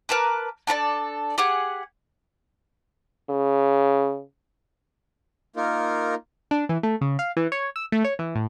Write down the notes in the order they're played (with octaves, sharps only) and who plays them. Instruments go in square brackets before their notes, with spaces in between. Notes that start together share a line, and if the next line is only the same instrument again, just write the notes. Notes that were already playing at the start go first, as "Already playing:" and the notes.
[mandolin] A#4 B4 A5 D6
D4 A4 A#4 D5
G4 G#4 F#5
[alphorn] C#3
[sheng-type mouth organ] A#3 D#4 F4 A#4
[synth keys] D4
E3
A3
C#3
F5
E3
C#5
E6
A3
C#5
E3
A2